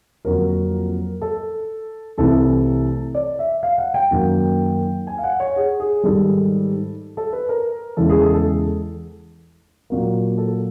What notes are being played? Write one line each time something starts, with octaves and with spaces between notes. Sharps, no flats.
F2 D3 F#3 A#3 A#4
A4
C2 C3 E3 A3 A4
D5
E5
F5
F#5
G5
F#2 D#3 F#3 A#3
G#5
F5
F#5
C#5
G#4
G#4
G#2 D#3 G3 A4
A4
B4
A#4
E2 C#3 E3 G#3 A4
G#4
A4
A4
A#2 F#3 A#3
A4